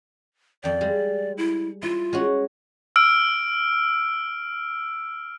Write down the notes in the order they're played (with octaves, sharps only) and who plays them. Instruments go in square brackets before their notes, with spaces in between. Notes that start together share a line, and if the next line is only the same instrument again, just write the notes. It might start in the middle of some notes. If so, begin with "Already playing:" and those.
[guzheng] F2 G5 [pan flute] D5
[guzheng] G3 G#3
[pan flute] E4
[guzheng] E4 [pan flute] F4
[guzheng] G#3 C#4 F#4
[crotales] E6 F6 D7